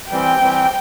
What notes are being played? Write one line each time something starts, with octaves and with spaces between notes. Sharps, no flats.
E3 G3 C4 G5
E3 G3 C4